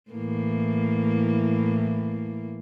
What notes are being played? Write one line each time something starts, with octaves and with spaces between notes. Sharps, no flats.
A2 E3 A#3